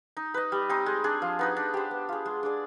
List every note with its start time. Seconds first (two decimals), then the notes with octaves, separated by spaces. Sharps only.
0.17 D#4
0.34 B4 D#5
0.52 G3
0.69 C4 D#4
0.86 G#3
1.04 D4 G#4
1.22 F3
1.39 B3 D#4 B4
1.57 D4
1.74 G4 C5
1.91 B3
2.09 F4 G#4
2.26 G#3
2.43 D4 G#4 D5